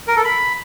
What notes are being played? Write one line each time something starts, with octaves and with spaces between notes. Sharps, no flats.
A#4
A4
B5